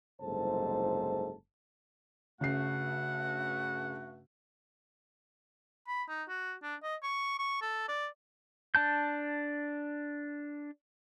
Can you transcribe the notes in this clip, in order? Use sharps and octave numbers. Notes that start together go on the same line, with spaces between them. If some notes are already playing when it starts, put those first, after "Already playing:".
F#1 C2 G#2 A4 C5 A5
G2 C#3 A3 F#4 F#5 C7
B5
D#4
F#4
D4
D#5
C#6
C#6
A4
D5
D4 A5 G6